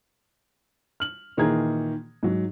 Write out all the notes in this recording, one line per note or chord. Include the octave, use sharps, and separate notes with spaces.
F6 F#7
A#2 D#3 E3 G#4 A#5 G#6
G#2 F#3